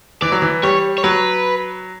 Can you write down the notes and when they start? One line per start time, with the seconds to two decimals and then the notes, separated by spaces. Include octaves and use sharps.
0.22 E3 D5
0.32 F#3
0.42 E3
0.63 G3 C#5
0.98 C#5
1.04 F#3 B4